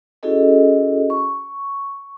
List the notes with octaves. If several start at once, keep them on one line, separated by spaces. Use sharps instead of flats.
C#4 E4 F#4 G#4 A4 D#5
C#6